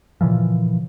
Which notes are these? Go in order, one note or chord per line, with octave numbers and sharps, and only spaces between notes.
A#2 C#3 E3 F3